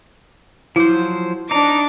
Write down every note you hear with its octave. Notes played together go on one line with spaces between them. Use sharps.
F3 F#3 E4 C5
D4 D#4 A#5 D6